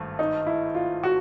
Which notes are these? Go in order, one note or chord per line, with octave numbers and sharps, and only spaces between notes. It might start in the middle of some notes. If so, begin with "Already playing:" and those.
Already playing: G#1 G2 A3
D#4
E4
F4
F#4